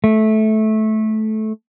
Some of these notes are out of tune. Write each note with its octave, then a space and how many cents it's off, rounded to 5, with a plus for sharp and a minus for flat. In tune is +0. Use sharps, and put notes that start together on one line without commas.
A3 -15